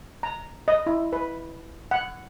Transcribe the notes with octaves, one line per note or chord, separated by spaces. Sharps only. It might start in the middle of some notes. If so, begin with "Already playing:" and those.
A#5
D#5
E4
B4
F#5